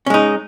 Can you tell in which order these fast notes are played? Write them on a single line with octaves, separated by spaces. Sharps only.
C#4 G#3 D#4